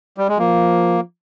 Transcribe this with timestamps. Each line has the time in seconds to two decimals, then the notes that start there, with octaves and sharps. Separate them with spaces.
0.18 G3
0.28 G#3
0.38 F3 A#3